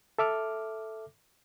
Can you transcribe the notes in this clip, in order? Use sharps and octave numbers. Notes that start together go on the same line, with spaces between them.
A4 E5 D6 F6